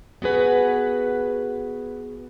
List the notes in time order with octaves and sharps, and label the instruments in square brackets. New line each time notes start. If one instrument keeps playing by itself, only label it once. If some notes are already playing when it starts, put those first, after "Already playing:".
[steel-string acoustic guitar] B3 F#4 G#4 B4 F#5